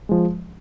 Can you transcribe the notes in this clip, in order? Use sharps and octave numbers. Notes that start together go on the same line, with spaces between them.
F3 G#3